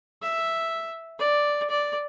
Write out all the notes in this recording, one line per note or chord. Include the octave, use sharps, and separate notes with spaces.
E5
D5
D5